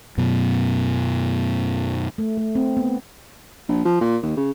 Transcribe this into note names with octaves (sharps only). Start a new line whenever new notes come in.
F#2 B2
A3
A3
C4
B3
A#1
F3
A#2
D#2
C#3